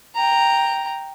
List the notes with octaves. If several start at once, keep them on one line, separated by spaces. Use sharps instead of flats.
G5 A#5